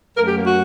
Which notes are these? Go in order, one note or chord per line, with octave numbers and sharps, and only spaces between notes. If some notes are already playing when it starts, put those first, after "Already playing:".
F#2 F#3 A3 A#4
G4
A#3
F#4